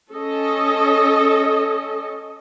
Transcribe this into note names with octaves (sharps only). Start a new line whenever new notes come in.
C#4 A4 D#5